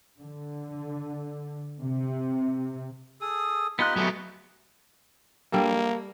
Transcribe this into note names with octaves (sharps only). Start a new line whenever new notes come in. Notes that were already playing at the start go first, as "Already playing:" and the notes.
D3
C3
G#4 A4 D#6
B3 D#4 F4 G4 D#5 F#6
F#3 A3 G#4
G3 A#3 D4 A4